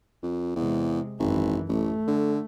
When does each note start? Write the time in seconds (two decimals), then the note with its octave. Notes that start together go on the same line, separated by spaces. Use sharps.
0.23 F2
0.56 E2 C3 G#3
1.20 G#1 F#2 E3
1.69 A1 A3
2.08 D3